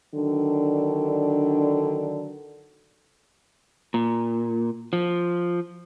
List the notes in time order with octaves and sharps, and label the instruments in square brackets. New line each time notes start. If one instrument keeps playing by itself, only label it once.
[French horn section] D3 D#3 F#3 D4
[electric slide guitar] A#2
F3